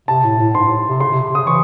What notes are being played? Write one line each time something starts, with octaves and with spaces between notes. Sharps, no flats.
C3 A5
A2
A2
G#2 C6
A2
C3
C#3 C6
C3
C3
C#3 D#6
E3 C#6